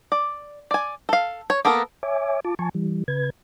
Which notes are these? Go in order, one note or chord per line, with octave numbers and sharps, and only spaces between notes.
D5
D5 G#5
A4 F5
C#5
A#3 B3 A4 A#4
C#5 E5 G#5 D6
F4 A5 D6
F3 G#5 A5 C#6
E3 G3
C#3 B4 G#6